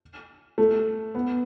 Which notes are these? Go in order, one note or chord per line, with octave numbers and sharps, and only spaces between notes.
A3
B3